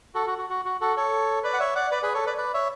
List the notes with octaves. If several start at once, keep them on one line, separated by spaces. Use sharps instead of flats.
F#4 A4
F#4
F#4
F#4
F#4
F#4 A4
A4 C#5
B4 D5
F#5
C#5 E5
D5 F#5
B4 D5
G#4 B4
A4 C#5
B4 D5
B4 D5
C#5 E5